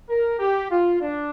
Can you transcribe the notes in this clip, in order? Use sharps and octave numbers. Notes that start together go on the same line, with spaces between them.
A#4
G4
F4
D4